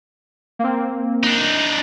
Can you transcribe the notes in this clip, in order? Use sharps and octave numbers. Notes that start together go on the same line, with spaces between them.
A#3 C4
D4 D#4